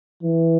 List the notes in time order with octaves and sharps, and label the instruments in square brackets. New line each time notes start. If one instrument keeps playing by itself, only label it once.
[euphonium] E3